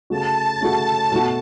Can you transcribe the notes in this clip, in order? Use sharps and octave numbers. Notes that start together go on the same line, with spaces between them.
C#3 A3 F#4 A5
C#3 A3 F#4
B2 A3 F#4